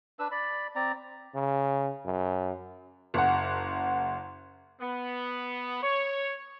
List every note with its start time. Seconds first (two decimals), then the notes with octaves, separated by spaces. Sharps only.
0.19 D4 B4 E6
0.31 D5 B5
0.76 C4 D5 A#5
1.35 C#3
2.05 F#2
3.14 F#1 F#5
4.81 B3
5.83 C#5